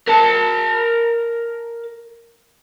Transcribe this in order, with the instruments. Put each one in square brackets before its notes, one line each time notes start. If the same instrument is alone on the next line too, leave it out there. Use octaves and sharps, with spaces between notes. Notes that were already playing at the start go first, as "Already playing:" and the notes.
[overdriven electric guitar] A#4 A5